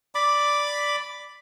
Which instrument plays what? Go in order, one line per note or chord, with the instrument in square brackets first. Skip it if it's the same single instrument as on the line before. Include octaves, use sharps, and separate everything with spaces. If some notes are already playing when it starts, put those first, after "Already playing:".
[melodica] D5 B5 D6